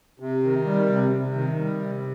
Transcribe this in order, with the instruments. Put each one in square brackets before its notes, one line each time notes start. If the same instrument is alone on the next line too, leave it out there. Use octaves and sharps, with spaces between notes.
[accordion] C3
D#3
G3
C3
C3
D#3
G3
C3